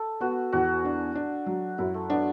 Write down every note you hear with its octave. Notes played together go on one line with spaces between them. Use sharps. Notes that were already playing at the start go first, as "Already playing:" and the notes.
Already playing: A4
B3 F#4
E2 F#4
D4
D4
F#3
F#2 E4
A3
B3 D4